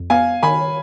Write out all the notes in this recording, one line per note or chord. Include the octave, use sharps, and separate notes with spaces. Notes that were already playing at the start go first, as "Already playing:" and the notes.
Already playing: F2
B3 F5 G#5
D#3 G#5 B5